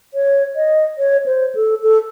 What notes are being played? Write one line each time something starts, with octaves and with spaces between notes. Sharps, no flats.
C#5
D#5
C#5
C5
A4
A4